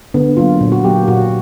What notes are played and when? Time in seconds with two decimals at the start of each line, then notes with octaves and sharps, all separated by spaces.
0.14 D3 B3
0.37 F#3 A#3 F4
0.61 A#2
0.72 F#4
0.84 F#3 A#3 G4
1.08 A#2 F#4